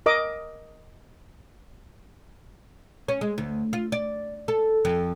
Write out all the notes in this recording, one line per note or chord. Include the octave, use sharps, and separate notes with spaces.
A#4 D#5 D6
C#4
G#3
D2
F4
D5
A4
F2